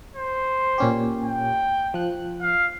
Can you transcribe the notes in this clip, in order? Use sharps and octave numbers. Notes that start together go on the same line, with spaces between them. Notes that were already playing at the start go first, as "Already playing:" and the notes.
C5
A#2 C#4 G4
G5
F3 F#6
F5